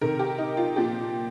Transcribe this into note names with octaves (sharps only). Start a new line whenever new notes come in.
C3 D#3 A#4
G4
D#4
F4
A#2 F3 G4